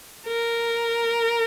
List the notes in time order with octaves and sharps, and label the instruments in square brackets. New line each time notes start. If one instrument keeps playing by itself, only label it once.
[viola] A#4